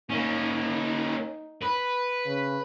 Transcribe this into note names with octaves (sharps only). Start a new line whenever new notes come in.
A#3 C#4 D#4
B4
C#3